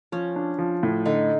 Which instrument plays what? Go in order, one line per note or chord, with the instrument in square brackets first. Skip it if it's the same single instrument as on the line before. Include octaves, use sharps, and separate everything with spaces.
[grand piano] F3 [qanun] C#4
[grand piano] D4
F3
A2
[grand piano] D3 [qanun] D#4